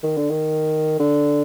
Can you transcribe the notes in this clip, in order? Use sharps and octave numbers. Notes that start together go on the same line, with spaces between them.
D#3
D3
D#3
D3